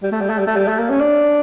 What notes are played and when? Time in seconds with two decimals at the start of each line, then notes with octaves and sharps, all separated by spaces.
0.03 G3
0.12 A3
0.21 G3
0.29 A3
0.38 G3
0.47 A3
0.56 G3
0.68 A3
0.79 A#3
0.90 C#4
1.00 D4